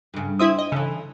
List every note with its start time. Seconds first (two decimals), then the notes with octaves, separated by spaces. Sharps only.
0.14 G2 C#3
0.39 C4 E4 E5 D#6
0.59 D#5
0.72 C#3 E3 A4